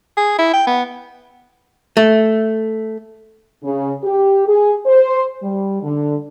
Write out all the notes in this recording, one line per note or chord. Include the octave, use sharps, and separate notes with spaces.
G#4
E4
G5
B3
A3
C#3
G4
G#4
C5
G3
D3